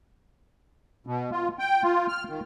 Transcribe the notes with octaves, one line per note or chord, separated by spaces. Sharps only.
B2
F4
G5
F4
F6
D#3